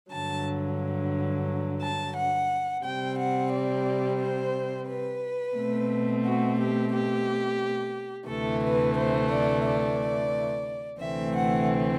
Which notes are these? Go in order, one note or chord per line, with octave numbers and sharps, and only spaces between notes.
G2 D3 F#3 A5
A5
F#5
C3 G3 C4 G5
F#5
D5
C5
B4
B2 A3 C4
F#4
G4
G4
D2 C3 E3 A3 A4
B4
C5
D5
D5
D2 C3 E3 A3 C4 E5
F#5